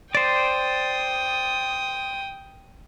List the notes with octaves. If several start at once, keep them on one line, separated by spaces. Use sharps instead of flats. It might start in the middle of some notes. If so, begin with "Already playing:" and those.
C5 D5 G5 D#6